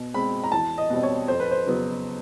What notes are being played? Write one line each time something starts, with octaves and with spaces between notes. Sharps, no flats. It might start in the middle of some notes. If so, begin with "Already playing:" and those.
Already playing: B2
G#3 C4 B5
A#5
E2 A5
D#5
B2 G3 C4
C#5
F2 C5
B4
C5
C#3 F#3 B3